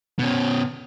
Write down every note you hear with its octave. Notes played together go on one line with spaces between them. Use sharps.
B2 C#4